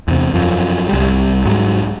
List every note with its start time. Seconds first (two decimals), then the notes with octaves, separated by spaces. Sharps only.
0.08 E2 C3
0.34 F#2 F3
0.89 C2 G3
1.45 G#2 F#3